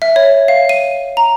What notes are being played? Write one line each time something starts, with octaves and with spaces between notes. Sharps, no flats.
E5
C#5
F5
D#7
A#5